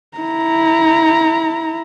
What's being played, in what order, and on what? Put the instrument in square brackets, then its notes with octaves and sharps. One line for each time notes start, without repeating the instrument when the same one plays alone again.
[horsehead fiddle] E4 A#5